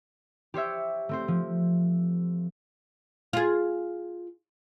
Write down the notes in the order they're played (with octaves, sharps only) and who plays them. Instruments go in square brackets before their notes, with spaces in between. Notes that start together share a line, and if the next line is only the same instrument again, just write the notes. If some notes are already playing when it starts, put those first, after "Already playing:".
[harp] G4 C5 C#5 E5
A3 C4 C5
F3
[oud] F4 G#4